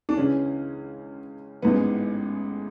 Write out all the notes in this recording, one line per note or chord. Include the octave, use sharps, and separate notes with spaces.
D4
C#2 C#3 E3 C#4
A1 G#2 E3 B3